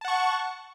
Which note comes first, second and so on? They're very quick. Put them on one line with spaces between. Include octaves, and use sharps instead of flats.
A5 F#5 C#6